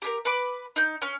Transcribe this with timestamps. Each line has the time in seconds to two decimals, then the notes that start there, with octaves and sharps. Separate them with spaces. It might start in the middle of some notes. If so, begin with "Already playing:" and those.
0.02 G4 G#4 A#4
0.25 B4 B5 D6
0.76 D#4 G6
1.02 C#4 F6